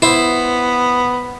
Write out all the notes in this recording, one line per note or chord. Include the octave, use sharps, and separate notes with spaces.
B3 E4 C5